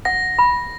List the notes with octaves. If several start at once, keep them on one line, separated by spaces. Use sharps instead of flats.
F#5 A#6
B5